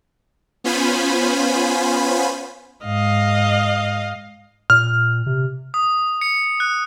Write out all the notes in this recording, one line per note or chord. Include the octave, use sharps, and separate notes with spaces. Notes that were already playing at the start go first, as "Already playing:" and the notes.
B3 C#4 F4 C5 G#5 B5
G#2 D#5 F5
A#2 F6
C3
D#6
C#7
F#6